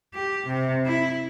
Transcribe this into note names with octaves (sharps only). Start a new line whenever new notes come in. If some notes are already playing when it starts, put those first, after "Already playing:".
G4
C3
E4